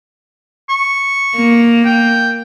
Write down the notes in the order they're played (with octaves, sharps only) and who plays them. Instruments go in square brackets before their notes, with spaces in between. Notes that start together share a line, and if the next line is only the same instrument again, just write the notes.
[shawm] C#6
[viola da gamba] A#3
[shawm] G5